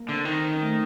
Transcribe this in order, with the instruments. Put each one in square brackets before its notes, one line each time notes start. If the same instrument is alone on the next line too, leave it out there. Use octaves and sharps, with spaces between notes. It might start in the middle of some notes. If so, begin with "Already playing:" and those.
Already playing: [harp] A#3
[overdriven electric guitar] D3 [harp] C4
[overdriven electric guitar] D#3
[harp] C4
C#4
A3